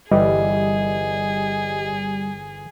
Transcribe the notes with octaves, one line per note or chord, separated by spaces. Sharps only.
G1 E3 G3 G#4 D#5